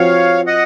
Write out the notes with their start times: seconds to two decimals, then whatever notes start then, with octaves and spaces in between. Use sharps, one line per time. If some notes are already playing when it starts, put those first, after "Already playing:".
Already playing: F3 C4 F#4 C#5 F5
0.47 D#5 F#5